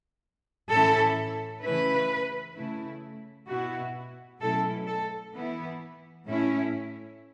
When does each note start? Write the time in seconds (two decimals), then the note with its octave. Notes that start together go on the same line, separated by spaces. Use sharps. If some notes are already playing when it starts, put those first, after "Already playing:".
0.69 A2 E3 C#4 E4 A4
1.63 C#3 E3 A3 C#4 E4 B4
2.56 C#3 A3 E4
3.48 B2 B3 E4 F#4
4.40 B2 F#3 A3 C#4 E4 A4
4.86 A4
5.34 E3 B3 E4
6.26 A2 A3 C#4 E4